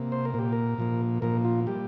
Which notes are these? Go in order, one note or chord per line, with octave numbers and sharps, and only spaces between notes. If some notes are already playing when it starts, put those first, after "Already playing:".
Already playing: C3 A#3
C5
A#4
A#2 A#3 G4
A#4
A#2 F3 A#3
A#2 F3 A#3 A#4
F4
G3 A#3 G4